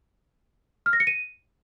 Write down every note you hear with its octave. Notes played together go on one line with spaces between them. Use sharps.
F6
A#6
C#7
D#7